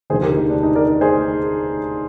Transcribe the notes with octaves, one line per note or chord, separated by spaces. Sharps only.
F1 D#2 D3 F3 G#4 C5
G4 A#4
D#4
D4
D#4
A#4 D5
G#4 C5